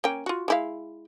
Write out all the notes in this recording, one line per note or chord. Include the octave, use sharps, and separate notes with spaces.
A#3 C#4 G5
F4 F#4
G#3 E4 F5